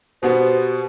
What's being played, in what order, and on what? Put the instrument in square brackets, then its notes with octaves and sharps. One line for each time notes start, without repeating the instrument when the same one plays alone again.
[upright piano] B2 B3 [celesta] G4 B4 [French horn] C5